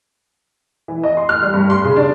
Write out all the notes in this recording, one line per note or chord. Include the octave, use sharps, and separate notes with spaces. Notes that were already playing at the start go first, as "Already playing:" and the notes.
E3
D#5
C6
F6
G3
G2
C6
C#3
D4